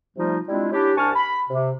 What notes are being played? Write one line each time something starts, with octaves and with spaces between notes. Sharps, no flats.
C3 F3 G3 A3 D#4 F4
G3 G#3 C4 D4 E4 F4
C#4 D4 E4 G4
C2 D4 G#5 A5 C#6 F6
B5
C3